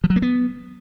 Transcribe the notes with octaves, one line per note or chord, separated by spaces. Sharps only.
F3
F#3
A#3
B3